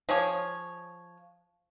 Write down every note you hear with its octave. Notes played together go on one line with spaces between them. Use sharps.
F3 G#4 C#5